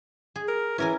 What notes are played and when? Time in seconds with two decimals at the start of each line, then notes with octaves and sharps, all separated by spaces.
0.36 G#4
0.48 A#4
0.78 E3 C#4 A#4 G#5